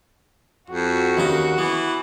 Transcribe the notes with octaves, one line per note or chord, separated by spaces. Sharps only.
F2 F#4
D#2 C#3 A#4
E3 B3